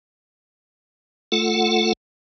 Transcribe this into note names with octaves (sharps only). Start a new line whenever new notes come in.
A3 F4 A4 F#5